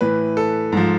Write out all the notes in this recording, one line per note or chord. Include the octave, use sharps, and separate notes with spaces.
A2 E3 B4
A4
G#2 F3